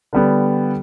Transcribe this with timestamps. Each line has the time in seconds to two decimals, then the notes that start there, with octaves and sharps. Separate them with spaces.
0.13 D3 G3 B3